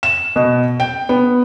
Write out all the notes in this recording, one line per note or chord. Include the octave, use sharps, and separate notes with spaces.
E7
B2
G5
B3